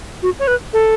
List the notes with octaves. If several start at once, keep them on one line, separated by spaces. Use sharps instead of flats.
F#4
C#5
B4
A4